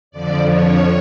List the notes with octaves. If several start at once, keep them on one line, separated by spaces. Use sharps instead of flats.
F2 D3 F3 D5
C#5